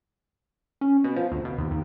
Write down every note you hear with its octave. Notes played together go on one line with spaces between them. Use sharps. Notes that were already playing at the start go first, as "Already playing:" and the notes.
C#4
B2
F3
D2
B2
D#2
D#2